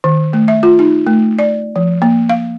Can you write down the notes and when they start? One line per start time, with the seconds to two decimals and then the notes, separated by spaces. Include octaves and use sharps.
0.04 D#3
0.33 A3
0.48 E5
0.63 F4
0.79 D#4
1.07 A3
1.39 D5
1.76 F3
2.02 A#3
2.30 F5